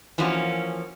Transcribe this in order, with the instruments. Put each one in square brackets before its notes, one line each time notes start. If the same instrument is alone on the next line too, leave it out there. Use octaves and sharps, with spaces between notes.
[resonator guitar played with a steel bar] E3 F3 A#3 C#4 F#4